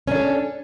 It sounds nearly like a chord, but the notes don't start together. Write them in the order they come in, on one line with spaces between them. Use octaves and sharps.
C#4 D4 A4